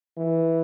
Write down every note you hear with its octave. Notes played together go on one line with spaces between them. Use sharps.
E3